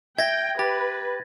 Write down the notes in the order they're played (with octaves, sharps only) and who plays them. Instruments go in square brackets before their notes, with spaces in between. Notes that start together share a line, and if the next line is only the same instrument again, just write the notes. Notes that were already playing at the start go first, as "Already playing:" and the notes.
[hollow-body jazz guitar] E5 [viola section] G5 [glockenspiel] G#6 A#6
[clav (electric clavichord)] G4 [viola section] B4 [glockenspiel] A6